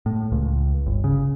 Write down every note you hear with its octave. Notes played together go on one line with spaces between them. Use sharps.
A2
C#2
G1
C#3